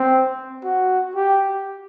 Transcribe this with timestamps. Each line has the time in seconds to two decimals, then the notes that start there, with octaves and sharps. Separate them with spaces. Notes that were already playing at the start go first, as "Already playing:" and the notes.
Already playing: C4
0.64 F#4
1.15 G4